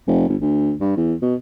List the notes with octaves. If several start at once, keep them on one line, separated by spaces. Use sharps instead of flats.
F1
G1
D2
G2
E2
B2